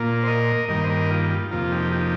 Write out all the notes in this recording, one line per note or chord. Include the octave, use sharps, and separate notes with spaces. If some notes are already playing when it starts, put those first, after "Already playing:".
Already playing: A#2 A#3 F4
C5
A#4 D#5
G2 D#3 G3 A#3 A#4 D#5
C5
A#4 D#5
F4
F4
F2 C3 F3 A#3 F4
D#4 G4
D#4 G4